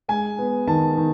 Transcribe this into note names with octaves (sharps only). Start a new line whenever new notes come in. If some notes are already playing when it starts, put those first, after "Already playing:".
G#3 G#5
B3
D#3 A5
D#3